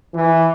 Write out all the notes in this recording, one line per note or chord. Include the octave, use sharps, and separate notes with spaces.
E3